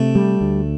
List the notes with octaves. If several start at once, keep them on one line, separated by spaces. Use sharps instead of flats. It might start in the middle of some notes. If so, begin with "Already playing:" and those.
Already playing: C3 A3 D4
G3
D2